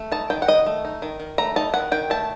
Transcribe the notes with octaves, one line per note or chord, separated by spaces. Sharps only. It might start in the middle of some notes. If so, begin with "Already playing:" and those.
Already playing: A3
D#4 A5
D#3 G5
F#5
D#3 D#5
A3
D#4
D#3
D#3
A3 A#5
D#4 A5
D#3 F#5
D#3 G5
A3 A5